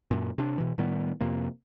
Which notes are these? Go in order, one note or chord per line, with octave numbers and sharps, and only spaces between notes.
F#2 A#2
C3 D4
B2 E3
A2 D#3 G3 B3
F2 C3 A#3